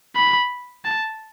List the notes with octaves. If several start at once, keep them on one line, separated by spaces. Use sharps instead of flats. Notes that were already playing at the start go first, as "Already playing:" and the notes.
B5
A5